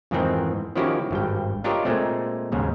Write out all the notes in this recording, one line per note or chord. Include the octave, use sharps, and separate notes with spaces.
F2 G#2 D#3 E3 C4
D#3 F3 C#4 E4 F#4 G4
G#1 G2 G5
D4 F4 G4 A#4 C#5 D#5
A#2 G#3 A3 C4
D#2 G#2 C#3